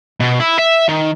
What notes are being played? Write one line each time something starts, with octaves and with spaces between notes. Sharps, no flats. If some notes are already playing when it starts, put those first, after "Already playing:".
B2
E4
E5
D#3